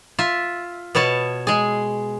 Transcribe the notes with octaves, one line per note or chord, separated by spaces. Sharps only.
F4 E5
B2 B3 C#5 A5
G#3 G#4